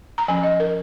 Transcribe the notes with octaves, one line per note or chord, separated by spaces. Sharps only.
A#5
F3 C#4 G#5
D#5
A#4